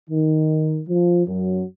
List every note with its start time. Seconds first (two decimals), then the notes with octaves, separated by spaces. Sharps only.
0.10 D#3
0.87 F3
1.27 F#2 F#3